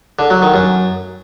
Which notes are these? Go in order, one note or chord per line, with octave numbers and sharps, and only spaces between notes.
D3
F#3
D#3
F#2